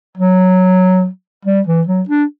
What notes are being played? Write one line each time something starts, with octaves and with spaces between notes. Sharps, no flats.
F#3
G3
E3
F#3
D4